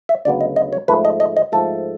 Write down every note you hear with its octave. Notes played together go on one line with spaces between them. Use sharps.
E5
D2 C#3 F#3 B3 D5
D#5
D#5
C#5
G#2 F3 A3 B4
D#5
D#5
D#5
G#2 F3 A3 A4